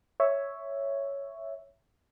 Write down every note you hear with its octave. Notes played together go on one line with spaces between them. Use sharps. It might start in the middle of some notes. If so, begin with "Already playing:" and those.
C#5 E5